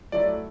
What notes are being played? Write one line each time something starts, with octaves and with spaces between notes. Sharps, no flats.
F#3 A3 E4 D5